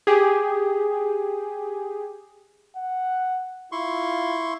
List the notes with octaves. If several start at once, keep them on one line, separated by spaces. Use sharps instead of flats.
G4 G#4
F#5
E4 F4 C6 C#6